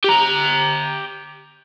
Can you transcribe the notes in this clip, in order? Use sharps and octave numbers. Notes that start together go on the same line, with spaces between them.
G4 A#5